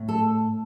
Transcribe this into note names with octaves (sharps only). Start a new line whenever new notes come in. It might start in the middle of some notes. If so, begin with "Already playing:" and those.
Already playing: A2
A4